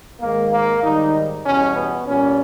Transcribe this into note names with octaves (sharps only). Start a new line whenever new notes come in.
G#2 D#3 G#3 A#3
A#3
G#2 D#3 G3 D#4
E2 B2 G3 C#4
B3
A#2 G3 C#4